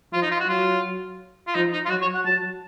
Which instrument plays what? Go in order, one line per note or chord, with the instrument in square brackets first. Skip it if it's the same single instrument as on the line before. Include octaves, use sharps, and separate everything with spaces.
[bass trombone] F3 [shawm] F4
[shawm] D#4
F4
F#4
[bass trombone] F#3 [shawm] F4
[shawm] F4
[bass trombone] F3 [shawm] D#4
[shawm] D#4
F4
[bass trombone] F#3 [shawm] F#4
[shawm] C#5
F#5
[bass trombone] F#3 [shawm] A5